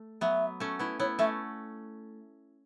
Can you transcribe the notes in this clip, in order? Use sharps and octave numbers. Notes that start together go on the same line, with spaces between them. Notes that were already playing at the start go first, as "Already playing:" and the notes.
Already playing: A3
F#3 B3 E5
A3 C#4
B3 E4
B3 E4 C#5
A3 C#4 E5